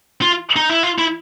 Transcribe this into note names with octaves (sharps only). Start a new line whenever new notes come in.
F4
D#4
E4
F4
E4